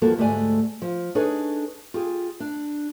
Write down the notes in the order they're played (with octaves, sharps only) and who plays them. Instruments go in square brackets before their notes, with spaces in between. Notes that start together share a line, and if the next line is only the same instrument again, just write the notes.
[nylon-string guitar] E2 F3 G3 A#3 F#4 A4
D2 G#2 A3 G4 D5 G#5
F3
D4 D#4 G#4 A4 B4 C#5
F4 G4 G#4
D4